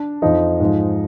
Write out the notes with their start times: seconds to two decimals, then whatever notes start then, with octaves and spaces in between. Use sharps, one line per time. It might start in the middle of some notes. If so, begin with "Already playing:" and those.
Already playing: D4
0.22 F2 F3 D#4
0.60 G#2 F3